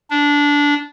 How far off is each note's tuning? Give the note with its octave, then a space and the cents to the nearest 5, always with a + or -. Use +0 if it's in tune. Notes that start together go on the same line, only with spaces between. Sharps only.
D4 -15